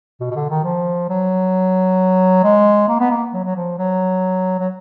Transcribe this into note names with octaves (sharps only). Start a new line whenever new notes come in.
B2
B2
D3
D#3
F3
F#3
G#3
A#3
B3
A#3
F#3
F#3
F3
F#3
F#3